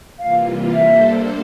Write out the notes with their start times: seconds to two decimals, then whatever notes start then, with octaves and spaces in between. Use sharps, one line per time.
0.19 C3 E3 G3 A#3 F4 F5
0.73 G3 A#3 D4 A4 C5 E5